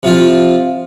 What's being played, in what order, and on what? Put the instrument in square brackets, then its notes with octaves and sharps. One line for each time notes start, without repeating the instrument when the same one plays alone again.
[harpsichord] C3 F3 F4